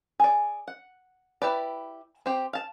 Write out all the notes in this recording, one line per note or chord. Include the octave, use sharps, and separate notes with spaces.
G#4 D5
F#5
E4 G4 B4 D5
C4 G4
F5 A5